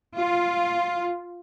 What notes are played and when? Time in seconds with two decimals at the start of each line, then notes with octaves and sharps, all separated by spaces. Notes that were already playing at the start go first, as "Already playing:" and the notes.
0.15 F4